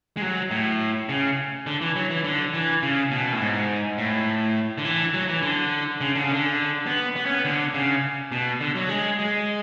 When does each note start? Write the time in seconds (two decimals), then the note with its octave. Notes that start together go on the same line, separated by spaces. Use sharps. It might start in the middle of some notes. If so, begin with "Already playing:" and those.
0.17 G#3
0.22 F#3
0.51 A2
1.09 C#3
1.67 D3
1.81 E3
1.96 F#3
2.10 E3
2.24 D3
2.54 E3
2.82 C#3
3.11 B2
3.33 A2
3.40 G#2
3.98 A2
4.78 D3
4.85 E3
5.14 F#3
5.29 E3
5.42 D3
6.01 C#3
6.15 D3
6.23 C#3
6.31 D3
6.87 B3
7.16 B3
7.26 C#4
7.34 B3
7.44 D3
7.74 C#3
8.32 B2
8.61 D3
8.75 F#3
8.89 G#3
9.19 G#3